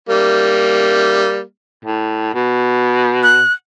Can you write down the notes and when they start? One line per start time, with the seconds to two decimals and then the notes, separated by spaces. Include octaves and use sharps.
0.09 G3 A#3
1.85 A2
2.34 B2
3.23 F#6